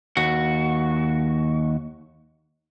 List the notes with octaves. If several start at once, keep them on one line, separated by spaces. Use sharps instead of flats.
D#2 F#4